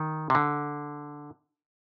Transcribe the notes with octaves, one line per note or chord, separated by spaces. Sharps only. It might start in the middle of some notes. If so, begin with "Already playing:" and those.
Already playing: D#3
C3
D3